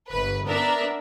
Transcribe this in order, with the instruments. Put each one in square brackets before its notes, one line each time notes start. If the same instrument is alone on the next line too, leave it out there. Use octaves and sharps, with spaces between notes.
[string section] G1 B4
B3 D4 A#4 E5